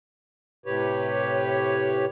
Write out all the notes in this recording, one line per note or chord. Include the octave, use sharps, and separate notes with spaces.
A2 C3 G4 B4 C#5